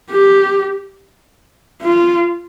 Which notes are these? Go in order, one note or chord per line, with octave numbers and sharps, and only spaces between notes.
G4
F4